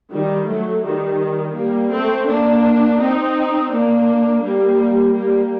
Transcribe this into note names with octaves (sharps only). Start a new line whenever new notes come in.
D#3 G3
F#3 A3
D#3 G3
G3 A#3
A3 C4
A#3 D4
C4 D#4
A#3 D4
G3 A#3
G3 A#3